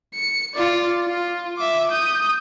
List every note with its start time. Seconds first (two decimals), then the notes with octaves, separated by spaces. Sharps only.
0.14 C#7
0.55 F4 D5
1.06 F4
1.58 E5 D6
1.91 D#6 G6